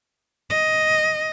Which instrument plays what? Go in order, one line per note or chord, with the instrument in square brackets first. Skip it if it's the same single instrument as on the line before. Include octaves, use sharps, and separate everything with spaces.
[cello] D#5